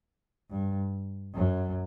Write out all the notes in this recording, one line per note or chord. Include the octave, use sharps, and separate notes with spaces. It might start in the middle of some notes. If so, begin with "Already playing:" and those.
G2
F#2